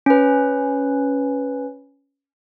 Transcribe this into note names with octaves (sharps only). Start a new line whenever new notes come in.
C#4 B4